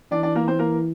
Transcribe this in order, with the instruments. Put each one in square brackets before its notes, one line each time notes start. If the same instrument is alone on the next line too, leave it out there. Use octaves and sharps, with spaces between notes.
[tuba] E3 [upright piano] D4 D5
[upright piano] D4 D5
A#3 A#4
C4 C5
A#3 A#4